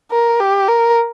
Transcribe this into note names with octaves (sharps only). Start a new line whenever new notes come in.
A#4
G4
A#4